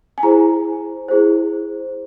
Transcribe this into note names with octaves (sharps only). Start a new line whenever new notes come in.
G#5
E4 G#4 C5 A#5
E4 G#4 C5